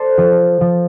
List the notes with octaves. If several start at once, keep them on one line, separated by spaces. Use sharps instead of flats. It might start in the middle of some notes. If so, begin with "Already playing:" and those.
Already playing: A4 C5 D5
F3
F3